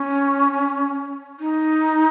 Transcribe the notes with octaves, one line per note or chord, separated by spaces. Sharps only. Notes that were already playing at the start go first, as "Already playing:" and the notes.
Already playing: C#4
D#4